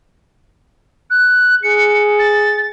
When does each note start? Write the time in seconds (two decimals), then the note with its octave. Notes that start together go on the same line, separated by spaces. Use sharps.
1.10 F#6
1.63 G#4 C#7
2.19 A6